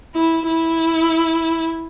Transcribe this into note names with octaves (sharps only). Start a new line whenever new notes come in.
E4
E4